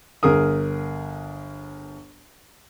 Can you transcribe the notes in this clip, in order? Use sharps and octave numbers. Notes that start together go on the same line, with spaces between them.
G1 G#4 A#4 D#6